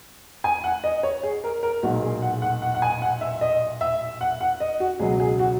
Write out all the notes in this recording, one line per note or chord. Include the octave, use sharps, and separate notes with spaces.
G#5
F#5
D#5
C#5
G#4
A#4
A#4
B1 A#2 G#3 F#4
G#4
F#5
F#5
F#5
F#5
G#5
F#5
E5
D#5
E5
F#5
F#5
D#5
F#4
C#2 B2 F#3 G#4
G#4
F#4